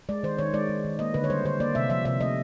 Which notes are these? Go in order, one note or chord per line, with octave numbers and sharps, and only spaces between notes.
G#3 D5
D#3 C5
D#3 C#5
G#3 D5
G#3
D#3
A#3 D#5
D3 B4
C#5
G3 C5
D3 C5
A#3 D5
C3 E5
F3 E5
C3 E5
A3 D#5